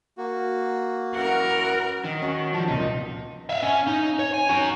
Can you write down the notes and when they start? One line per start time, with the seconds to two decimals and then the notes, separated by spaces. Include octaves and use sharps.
0.18 A#3 F#4
1.15 F#2 E3 A#4 F#5
2.04 D#3
2.22 C#4 F#4
2.54 F3 G3 A5
2.68 F1 C#2 A#2 D#4
3.49 E5 F5
3.62 C#4
3.87 D#4
4.19 C#5
4.34 G#5
4.49 C#4 F#4